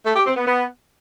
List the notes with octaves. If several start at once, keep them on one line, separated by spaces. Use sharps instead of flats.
A3
G4
C4
B3
B3